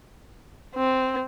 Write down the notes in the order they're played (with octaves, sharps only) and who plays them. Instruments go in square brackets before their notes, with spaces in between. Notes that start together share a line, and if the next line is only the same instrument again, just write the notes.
[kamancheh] C4